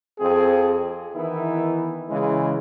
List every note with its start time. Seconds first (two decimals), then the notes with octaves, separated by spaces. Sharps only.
0.19 F2 C4 G#4
1.14 D#3 E3 B3 D#4 E4
2.10 C#3 E3 G#3